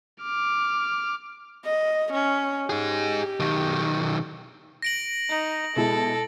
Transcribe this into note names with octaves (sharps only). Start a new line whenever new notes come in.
D6 F6
D#5
C#4
D#4 G4 G#4
B1 D#3
A#6 D7 F#7
D#4
B2 G#3 E4 A4